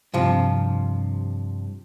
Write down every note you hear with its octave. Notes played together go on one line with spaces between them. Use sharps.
G2 C3 F3